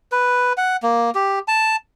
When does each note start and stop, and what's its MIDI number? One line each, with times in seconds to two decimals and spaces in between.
0.12 0.53 71
0.57 0.76 78
0.83 1.10 58
1.15 1.39 67
1.48 1.76 81